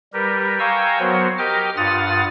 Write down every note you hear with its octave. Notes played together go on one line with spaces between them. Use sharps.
G3 G4 A#4 B4
F5 G5 G#5 A#5 C#6 E6
F#3 B3 F#4 A#4 C5 C#5
G4 A#4 D#5 G5 D6 F6
G2 F4 F#5 D#6 F6 A6